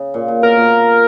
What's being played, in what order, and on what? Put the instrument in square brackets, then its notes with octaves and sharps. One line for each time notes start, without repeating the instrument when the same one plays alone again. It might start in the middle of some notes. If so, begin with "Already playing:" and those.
Already playing: [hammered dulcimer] C#3
A#2
A#2
[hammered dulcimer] B2 [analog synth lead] A#4
[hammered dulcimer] A#2